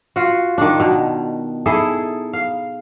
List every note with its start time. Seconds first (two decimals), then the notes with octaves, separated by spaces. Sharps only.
0.16 F4 F#4
0.58 D#3 D4
0.80 B2
1.66 D#4 E4 G#4 A4
2.33 F5